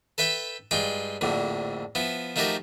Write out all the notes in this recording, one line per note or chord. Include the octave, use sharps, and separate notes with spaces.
A4 B4 E5 G5
G2 G#3 F4 G5
A#1 F2 A2 D3
F3 B3 E4
F3 A3 D#4 F#4 G4 A#4